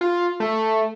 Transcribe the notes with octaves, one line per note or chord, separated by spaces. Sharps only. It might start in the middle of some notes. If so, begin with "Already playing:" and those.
F4
A3